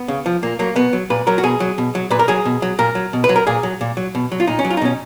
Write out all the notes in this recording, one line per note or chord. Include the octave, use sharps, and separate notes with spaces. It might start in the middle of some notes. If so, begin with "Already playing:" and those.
Already playing: B3
C#3
F3
A#2 A#3
F#3 A#3
B2 B3
F#3
A#2 B4
F#3 A#4
F#4
B2 G#4
F#3
B2
F#3
A#2 B4
A#4
F#3 G#4
B2
F#3
A#2 A#4
F#3
B2
B4
F#3
A#4
A#2 G#4
F#3
A#2
F#3
B2
F#3
F4
A#2 D#4
C#4
F#3
F4
D#4
B2 C#4